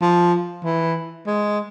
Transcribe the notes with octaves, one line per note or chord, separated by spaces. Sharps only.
F3
E3
G#3